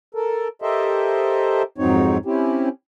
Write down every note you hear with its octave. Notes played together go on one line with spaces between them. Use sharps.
A4 A#4
G4 A4 A#4 C5 D#5 E5
F2 G#2 F#3 C4 D#4 C#5
C4 C#4 E4 G4